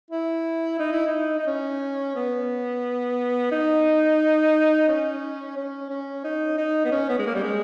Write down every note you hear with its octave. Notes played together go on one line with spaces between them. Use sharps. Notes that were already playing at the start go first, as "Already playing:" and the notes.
E4
D#4
E4
D#4
D#4
C#4
B3
D#4
C#4
C#4
C#4
D#4
D#4
B3
C#4
B3
G#3
A#3
G3
G#3